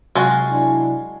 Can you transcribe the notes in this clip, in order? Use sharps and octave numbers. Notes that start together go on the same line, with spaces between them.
C3 F#3 G#3 F4 F#4 G#5 A5
D4 E4